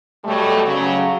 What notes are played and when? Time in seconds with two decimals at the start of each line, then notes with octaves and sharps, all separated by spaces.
0.24 B2 F#3 G3 A3
0.63 C#3 F#3